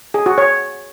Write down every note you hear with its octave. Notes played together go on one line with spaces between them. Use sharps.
G#4
F#4
C#5